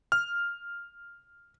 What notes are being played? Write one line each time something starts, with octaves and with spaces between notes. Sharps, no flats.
F6